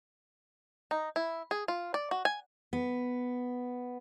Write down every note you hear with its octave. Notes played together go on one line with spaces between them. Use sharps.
D#4
E4
G#4
F4
D5
F#4
G#5
B3